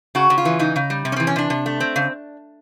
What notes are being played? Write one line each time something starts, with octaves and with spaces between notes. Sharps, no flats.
C#3 F#4
C#3
F4
E3
C#3 D#4
C#3
G3
C3
C#4
E3 C4
C#4
C3 D4
C3
A3
C4
C#3